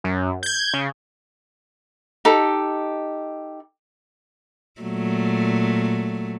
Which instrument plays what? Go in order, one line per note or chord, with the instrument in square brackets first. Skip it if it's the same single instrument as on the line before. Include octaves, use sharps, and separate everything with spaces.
[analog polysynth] F#2
G6 G#6
C#3
[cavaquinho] D#4 G4 A4
[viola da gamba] A#2 F#3 A3